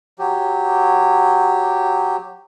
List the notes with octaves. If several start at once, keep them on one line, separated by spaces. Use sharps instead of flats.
F#3 G4